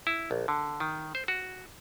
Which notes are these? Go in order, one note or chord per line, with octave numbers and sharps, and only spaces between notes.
E4
A#1
D3
D#3
C5
F#4